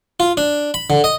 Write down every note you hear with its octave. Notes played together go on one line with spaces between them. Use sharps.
F4
D4
B5
D3
D#5